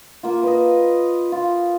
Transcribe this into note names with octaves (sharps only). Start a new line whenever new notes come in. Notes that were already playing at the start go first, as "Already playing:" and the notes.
A#3 F4
B4 D#5
F4